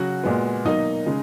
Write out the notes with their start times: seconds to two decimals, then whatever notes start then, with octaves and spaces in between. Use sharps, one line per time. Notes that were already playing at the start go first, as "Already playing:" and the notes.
Already playing: C#3 F#3 C#4 F#4 F#5
0.24 A#2 G#3 B3
0.65 B2 F#3 A#3 D#4 D#5
1.06 C#3 G#3